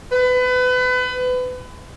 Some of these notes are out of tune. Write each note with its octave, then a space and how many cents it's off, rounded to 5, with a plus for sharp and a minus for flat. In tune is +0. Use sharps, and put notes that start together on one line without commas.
B4 +30